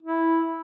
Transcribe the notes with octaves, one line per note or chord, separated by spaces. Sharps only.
E4